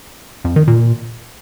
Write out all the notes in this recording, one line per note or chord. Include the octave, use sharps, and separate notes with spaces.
F2
D#3
A#2